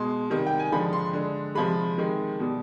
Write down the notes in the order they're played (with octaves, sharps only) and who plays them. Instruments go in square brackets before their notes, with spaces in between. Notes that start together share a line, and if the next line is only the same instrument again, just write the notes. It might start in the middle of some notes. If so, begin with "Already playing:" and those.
Already playing: [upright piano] B2 G#3 C6
C3 D#3 G3
G5
G#5
D3 F3 G#3 B5
C6
D3 G#3
C3 F3 G#3 B5
C3 D#3 G#3
B2 G3